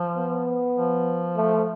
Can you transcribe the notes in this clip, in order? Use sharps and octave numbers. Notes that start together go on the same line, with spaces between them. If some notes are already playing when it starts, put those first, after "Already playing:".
Already playing: F3
B3
F3
A3